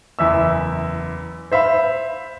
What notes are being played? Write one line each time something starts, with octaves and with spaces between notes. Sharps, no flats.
F#1 E2 E5 E6
C5 E5 F5 B5